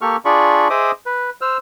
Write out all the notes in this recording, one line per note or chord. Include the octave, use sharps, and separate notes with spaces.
A#3 G4 A4 C#6 F6
D4 F4 G#4 D5 B5 C#6
G#4 C5 D#5 E5 D6 D#6
B4
C5 E6 F6